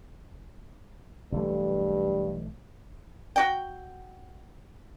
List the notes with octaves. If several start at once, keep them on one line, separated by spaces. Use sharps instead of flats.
B1 G2 E3 A3
F#4 G5